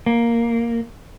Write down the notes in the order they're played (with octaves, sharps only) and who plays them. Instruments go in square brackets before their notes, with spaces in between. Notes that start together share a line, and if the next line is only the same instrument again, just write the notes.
[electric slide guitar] A#3